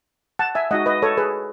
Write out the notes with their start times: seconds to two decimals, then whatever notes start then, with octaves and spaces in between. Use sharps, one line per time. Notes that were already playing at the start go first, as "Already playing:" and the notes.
0.39 F#5 A5
0.55 E5 G#5
0.71 G#3 D#4 F#4 D#5 F#5
0.86 B4 D#5
1.02 A4 C#5
1.17 G#4 B4